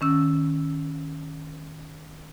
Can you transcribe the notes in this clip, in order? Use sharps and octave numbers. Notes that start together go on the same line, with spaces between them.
D#3 C#4 E6